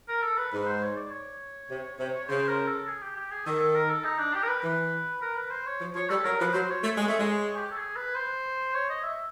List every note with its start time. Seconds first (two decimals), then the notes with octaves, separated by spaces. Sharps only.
0.09 A#4
0.23 A4
0.38 B4
0.52 G#2 B4
0.67 C5
0.82 C#5
0.96 D5
1.11 C#5
1.70 C3
1.99 C3
2.28 C#3 C5
2.48 A#4
2.68 A4
2.87 G#4
3.01 G4
3.16 G4
3.31 G#4
3.46 D#3 A4
3.60 A4
3.76 A#4
3.90 A4
4.04 D#4
4.19 D4
4.34 G4
4.43 A#4
4.48 B4
4.63 E3 B4
5.22 A#4
5.36 B4
5.51 C5
5.66 C#5
5.81 F3
5.95 F3 C#5
6.10 G3 A4
6.25 F#3 A#4
6.40 F3 B4
6.53 F#3 C5
6.69 C#5
6.83 A3 C#5
6.98 G#3
7.08 A3
7.19 G#3
7.57 G4
7.71 A4
7.76 G#4
7.96 B4
8.16 C5
8.74 C#5
8.89 D#5
9.04 E5